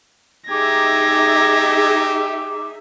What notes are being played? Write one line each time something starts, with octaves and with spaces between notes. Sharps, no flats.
D#4 G4 G#4 E5 D6 G#6 A#6